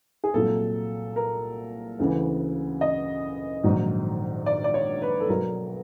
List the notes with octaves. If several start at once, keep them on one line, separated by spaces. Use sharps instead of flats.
G#4
C2 A#2 F#3 A4
A#4
D2 C#3 E3
D#5
A#1 G#2 D#3 F#3
D5
D5
C#5
B4
A4
B1 B2 F#3 A#4